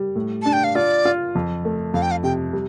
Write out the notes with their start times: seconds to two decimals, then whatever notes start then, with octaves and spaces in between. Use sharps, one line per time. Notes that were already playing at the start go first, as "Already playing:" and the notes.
Already playing: G3
0.16 A2
0.42 D4 A5
0.53 G5
0.64 F5
0.75 F4 D5
1.05 F4
1.35 F2
1.65 A3
1.94 F2 F5
2.02 G5
2.11 F5
2.23 C3 G5
2.53 G3